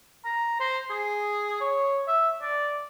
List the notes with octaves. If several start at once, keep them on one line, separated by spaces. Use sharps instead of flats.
A#5
C5
G#4
C#5
E5
D5